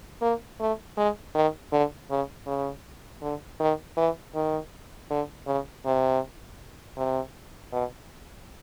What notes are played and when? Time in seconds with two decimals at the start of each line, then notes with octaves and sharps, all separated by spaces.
0.21 A#3
0.60 A3
0.97 G#3
1.35 D#3
1.72 D3
2.10 C#3
2.46 C#3
3.22 D3
3.60 D#3
3.97 E3
4.35 D#3
5.10 D3
5.47 C#3
5.85 C3
6.97 C3
7.73 B2